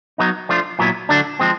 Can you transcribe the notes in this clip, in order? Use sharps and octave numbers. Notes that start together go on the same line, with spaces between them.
F#3 B3 D#4
F3 A3 D4 F4
A#2 F#3 B3 E4
D3 F#3 A3 D4
F3 G#3 C4